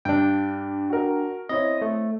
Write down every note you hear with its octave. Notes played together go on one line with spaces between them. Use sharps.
G2 D4 G5
F#4 A#4
C4 E4 C#5 D#5
A3